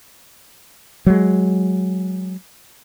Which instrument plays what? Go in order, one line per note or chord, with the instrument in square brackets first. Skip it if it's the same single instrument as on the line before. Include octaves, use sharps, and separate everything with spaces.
[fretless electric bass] F#3 G#3